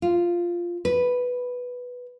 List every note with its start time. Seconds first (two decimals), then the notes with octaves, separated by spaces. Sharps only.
0.02 F4
0.85 B4